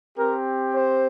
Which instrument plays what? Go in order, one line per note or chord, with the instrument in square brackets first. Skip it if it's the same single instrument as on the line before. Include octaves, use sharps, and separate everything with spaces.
[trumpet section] C4 G4 A#4
C5